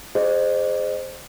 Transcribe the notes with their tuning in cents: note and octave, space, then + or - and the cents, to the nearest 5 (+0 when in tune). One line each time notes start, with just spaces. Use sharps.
G#4 +0 C5 +0 D#5 -30